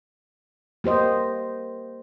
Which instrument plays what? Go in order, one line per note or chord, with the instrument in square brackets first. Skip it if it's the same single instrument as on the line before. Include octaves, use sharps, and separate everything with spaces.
[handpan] A#3 G4 C5 D#5